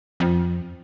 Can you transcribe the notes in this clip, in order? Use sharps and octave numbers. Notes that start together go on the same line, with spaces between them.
F2